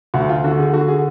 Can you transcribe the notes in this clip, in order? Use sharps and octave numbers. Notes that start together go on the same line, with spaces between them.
D2 F#4
F4
D3 F#4
G#4
D3 F#4
G#4